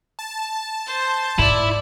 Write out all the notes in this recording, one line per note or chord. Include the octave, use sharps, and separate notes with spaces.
A5
C5
G#2 E4 D5